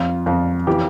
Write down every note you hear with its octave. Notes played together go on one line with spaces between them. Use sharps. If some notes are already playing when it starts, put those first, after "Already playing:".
Already playing: F2 F4
F2
E3 G4